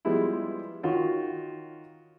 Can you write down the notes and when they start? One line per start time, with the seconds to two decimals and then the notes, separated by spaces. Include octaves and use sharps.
0.05 F3 G3 G#3 B3 E4
0.83 D#3 F4 F#4 C#5